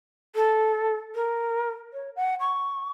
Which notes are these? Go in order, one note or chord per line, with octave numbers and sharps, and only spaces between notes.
A4
A#4
C#5
F#5
C#6